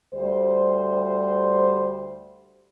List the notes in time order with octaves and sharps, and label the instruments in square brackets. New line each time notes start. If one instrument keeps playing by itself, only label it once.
[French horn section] D2 G3 C5